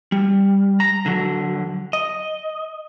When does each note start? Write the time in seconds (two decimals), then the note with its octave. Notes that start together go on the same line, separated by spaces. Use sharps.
0.12 G3
0.80 A#5
1.06 D3 F#3
1.93 D#5